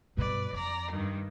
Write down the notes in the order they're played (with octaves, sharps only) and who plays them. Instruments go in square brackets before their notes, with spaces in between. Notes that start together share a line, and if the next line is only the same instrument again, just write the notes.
[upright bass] G2 B2 [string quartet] B4 D5
[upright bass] F2 [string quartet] D5 A#5
[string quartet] G2 D#3